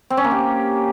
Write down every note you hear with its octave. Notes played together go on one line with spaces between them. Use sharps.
C4
C#4
A#3
G4